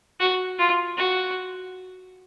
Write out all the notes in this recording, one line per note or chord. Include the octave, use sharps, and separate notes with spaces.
F#4
F4
F#4